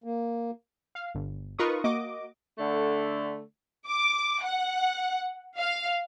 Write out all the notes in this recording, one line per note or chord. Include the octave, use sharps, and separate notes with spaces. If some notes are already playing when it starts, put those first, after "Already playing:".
A#3
F5
G1
D#4 F4 A#4 B4 C#6 D#6
A#3 F#4 D#5 D6
D3 A3
D6
F#5
F5